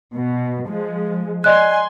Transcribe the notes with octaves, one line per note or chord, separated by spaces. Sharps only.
B2
F3 G#3
D5 D#5 G#5 C6 F#6